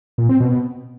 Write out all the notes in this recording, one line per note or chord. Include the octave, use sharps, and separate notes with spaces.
A#2
C4
B2